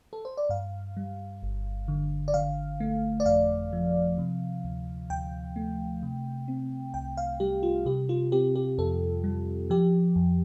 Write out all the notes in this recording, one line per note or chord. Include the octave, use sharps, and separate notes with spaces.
A4
C5
D5
G2 F5
G3
G1
D3
D5
D3 F5
A3
D5
F2 F5
F3
C3
D2
D2 G5
A3
C3
C4
C2 G5
F5
G3 G4
F4
C3 G4
F4
C4 G4
G4
F2 A4
G3
F3 G4
F2